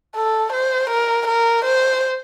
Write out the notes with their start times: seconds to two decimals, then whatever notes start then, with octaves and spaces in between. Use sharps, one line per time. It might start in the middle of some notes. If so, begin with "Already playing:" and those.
0.16 A4
0.53 C5
0.90 A#4
1.27 A#4
1.65 C5